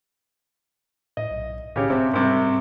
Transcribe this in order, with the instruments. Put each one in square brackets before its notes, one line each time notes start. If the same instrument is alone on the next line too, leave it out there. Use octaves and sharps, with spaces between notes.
[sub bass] A2 [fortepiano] D#5
[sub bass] B1
[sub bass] A2 [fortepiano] C#3 G4 C#5
[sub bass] D1 [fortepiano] C3 C4
[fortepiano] C2 C3 [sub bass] G#2